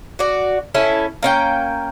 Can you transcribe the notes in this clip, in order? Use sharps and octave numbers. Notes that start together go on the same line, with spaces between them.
F#4 D5
C#4 E4 A4
A#3 C#4 G5